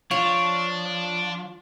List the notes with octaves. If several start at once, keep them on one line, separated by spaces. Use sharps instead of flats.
F3 D4 F4 C#5